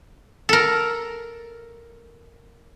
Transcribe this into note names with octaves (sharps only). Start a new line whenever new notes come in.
A4 A#4